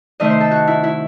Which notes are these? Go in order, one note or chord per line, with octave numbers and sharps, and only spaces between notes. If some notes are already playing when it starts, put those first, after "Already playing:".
C3 D#3 A3 D#5
C5
A4
F#4
E4
E4